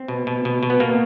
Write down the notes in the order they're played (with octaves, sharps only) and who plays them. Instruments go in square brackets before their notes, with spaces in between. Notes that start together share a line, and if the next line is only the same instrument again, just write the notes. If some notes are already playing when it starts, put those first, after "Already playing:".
Already playing: [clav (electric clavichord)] C4
B2
B2
B2
B2
B3
B2 A#3